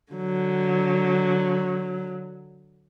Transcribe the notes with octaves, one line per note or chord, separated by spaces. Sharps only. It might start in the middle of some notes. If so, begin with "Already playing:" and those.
D3 F#3